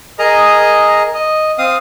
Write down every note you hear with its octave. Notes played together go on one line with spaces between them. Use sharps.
G#4 A#4 D#5 A#5
D#5
C4 F5 D#6